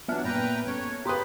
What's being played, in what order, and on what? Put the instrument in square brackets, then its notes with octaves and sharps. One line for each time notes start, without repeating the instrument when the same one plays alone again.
[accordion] E3 F#3 D4 [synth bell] B3 E5 F6
[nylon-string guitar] A#2 [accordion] B4 G5 A#5
[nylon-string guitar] C#4 A4 [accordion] C#5
[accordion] C#3 B3 [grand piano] G4 B4 [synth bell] A#5 C6 D#6